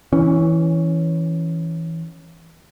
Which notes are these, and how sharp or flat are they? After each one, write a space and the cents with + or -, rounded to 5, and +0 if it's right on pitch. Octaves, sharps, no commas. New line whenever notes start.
E3 -10 C#4 +0